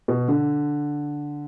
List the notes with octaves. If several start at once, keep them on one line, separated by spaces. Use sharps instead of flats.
B2
D3